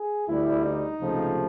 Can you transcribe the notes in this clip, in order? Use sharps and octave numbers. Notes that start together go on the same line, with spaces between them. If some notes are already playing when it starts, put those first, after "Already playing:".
Already playing: G#4
D2 D3 G3 E4
D#4
C#2 C3 F3 A3